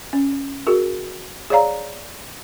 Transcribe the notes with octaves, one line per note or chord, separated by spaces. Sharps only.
C#4
F#4 G#4 A#4
G#4 C#5 D5 F5 A#5